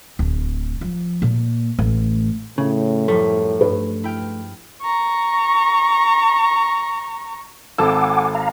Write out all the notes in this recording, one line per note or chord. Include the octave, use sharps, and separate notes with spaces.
D1
F3
A#2
A1
A2 C#3
F#2 F3 G3 A3
G2 B4
E4 G5 F6
A#5 C#6
G#1 A4 F#5 G#5 D6 E6
F5 A#5